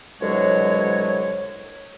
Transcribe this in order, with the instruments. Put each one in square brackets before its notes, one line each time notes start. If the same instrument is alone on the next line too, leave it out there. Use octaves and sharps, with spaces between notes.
[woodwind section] C2 B2 D3 F#3 G#3 C#5